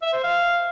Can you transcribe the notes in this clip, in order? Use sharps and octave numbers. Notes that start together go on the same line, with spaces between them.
E5
C5
F5